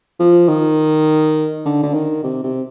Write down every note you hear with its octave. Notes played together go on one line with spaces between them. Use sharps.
F3
D#3
D3
D3
D#3
C3
C3